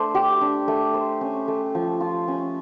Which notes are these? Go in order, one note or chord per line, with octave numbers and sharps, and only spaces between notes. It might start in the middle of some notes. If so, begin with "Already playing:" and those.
Already playing: A3 D4 C5
G4
D4
A3
C5
C#4
A3
F3
F4
C#4